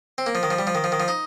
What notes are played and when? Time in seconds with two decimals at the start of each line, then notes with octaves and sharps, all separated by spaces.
0.18 C4
0.26 A#3
0.35 F3
0.43 D#3
0.50 F3
0.59 G3
0.67 F3
0.75 D#3
0.84 F3
0.92 D#3
1.00 F3
1.08 D#4